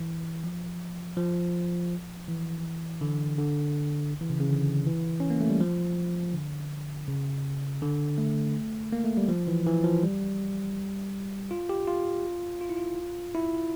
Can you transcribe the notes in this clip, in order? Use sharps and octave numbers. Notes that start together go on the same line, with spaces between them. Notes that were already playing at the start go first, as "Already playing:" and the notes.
Already playing: E3
F3
F3
E3
D3
D3
E3
C#3
C#3
D3
E3
C#4
A#3
A3
G3
F3
D3
C#3
D3
A3
A#3
A3
G3
F3
E3
E3
F3
G3
F4
G4
F4
F4
E4
F4
E4